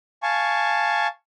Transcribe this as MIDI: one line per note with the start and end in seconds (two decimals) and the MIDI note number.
0.23 1.07 77
0.23 1.07 80
0.23 1.07 81
0.23 1.07 85